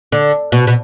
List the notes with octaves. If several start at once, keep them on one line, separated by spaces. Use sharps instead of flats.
D3
B2
B2